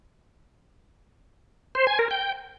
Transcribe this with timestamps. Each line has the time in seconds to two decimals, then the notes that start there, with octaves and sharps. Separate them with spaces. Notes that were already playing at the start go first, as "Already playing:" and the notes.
1.75 C5
1.87 G#5
1.99 A#4
2.11 G5